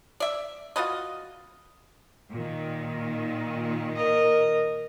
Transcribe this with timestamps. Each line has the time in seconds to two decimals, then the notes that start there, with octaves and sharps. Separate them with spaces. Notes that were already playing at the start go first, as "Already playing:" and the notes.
0.20 D5 E5
0.76 F4 F#4 B4 D#5
2.29 A#2 D#3
3.95 A#4 D#5